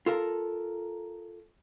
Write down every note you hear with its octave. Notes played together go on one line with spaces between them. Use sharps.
F4 A4 A#4